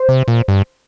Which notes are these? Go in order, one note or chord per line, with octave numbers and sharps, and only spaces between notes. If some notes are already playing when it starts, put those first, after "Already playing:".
Already playing: C5
C3
A#2
G2